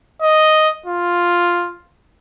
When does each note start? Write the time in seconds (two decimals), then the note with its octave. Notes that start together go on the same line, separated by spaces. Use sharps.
0.22 D#5
0.86 F4